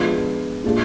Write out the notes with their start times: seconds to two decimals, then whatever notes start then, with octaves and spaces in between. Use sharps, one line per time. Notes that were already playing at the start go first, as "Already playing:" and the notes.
Already playing: F3 G#3 B3 D4 F4
0.64 A#2 G#3 D4 F4 G#4